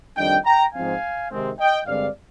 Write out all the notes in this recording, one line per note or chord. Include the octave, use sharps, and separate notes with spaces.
F2 D#3 G3 D4 D#5 G5
G5 A#5
G#2 F3 C4 F5 G#5
C3 D#3 G#3 C4
D#5 G5
G2 D3 G#3 C4 D5 F5